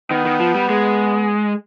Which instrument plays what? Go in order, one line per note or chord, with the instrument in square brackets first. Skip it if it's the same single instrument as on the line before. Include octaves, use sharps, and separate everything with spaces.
[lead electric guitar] D#3 [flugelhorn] B3
[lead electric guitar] D#3
F3
G3
G#3